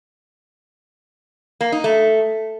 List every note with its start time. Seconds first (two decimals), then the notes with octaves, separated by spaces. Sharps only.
1.61 A#3
1.72 D#4
1.84 A3